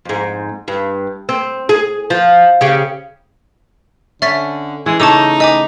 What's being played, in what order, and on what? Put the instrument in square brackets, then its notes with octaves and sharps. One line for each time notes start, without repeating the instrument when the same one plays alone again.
[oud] F2 G#2
G2
C4
G#4
F3
C#3 G4
[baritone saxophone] D3 [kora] C#4 [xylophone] E5 A6 B6
[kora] E3 [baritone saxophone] G#3
[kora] C#3 A3 [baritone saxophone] D#4 [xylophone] A5 D6 E6
[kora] B4 [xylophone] D#5 G#5 D6